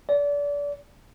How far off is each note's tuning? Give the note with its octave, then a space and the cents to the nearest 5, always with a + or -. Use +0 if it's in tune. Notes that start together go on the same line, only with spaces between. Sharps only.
D5 -30